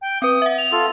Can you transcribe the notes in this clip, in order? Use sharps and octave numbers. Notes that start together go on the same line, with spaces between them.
G5
C4 B4 D#6
E5 F#5
F7
F4 A4